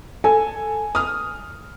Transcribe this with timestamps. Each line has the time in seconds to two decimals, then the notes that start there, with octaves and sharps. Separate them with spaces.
0.24 A4 G#5
0.95 D#6 F6